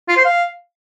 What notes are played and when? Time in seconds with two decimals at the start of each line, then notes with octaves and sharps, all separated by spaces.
0.08 F4
0.17 C5
0.25 F5